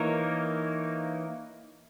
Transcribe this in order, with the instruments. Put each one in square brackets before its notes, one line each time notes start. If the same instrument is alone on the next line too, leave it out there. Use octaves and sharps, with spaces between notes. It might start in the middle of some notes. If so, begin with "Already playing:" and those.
Already playing: [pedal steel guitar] E3 A#3 D#4 A#4 C#5